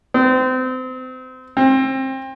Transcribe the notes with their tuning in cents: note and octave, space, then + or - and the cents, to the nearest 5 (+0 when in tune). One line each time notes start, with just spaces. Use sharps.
C4 -30
C4 +25